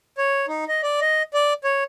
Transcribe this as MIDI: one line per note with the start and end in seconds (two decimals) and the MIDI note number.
0.18 0.46 73
0.48 0.65 63
0.68 0.81 75
0.83 1.00 74
1.01 1.23 75
1.34 1.53 74
1.64 1.84 73